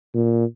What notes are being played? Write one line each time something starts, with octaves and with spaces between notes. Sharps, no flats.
A#2